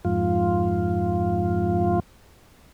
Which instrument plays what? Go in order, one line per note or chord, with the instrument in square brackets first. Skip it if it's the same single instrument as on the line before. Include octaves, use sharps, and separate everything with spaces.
[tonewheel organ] F2 G#2 F4